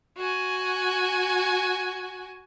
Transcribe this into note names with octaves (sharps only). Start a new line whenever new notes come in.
F#4 G#5